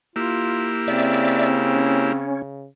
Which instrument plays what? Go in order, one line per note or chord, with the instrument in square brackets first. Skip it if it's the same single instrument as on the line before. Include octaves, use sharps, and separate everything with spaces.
[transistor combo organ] A#3 E4 G4 [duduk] F4
[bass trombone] C#3 [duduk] C4 [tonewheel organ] D5 E5
[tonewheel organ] C#4